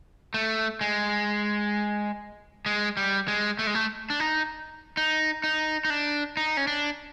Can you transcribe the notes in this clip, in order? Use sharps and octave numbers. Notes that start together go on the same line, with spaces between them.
A3
G#3
G#3
G3
G#3
A3
G#3
A3
D4
D#4
D#4
D#4
D#4
D4
D#4
C#4
D4